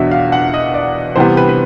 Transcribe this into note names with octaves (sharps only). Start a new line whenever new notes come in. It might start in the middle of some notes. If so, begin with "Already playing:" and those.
Already playing: E2 B2 F#3 B3 D4 E5
F5
F#5
D#5
D5
C3 E3 G3 B3 C5
B4
B4